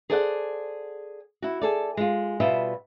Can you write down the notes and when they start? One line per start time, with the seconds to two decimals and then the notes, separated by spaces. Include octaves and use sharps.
0.10 G#4 A4 C5 D5 E5 F#5
1.42 E4 F#4
1.61 G#4 A4 D5
1.97 G#3 F4
2.40 B2 G3 F4 D#5 E5